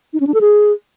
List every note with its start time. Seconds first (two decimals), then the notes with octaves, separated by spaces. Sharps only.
0.13 D#4
0.20 C#4
0.27 D4
0.34 A4
0.41 G#4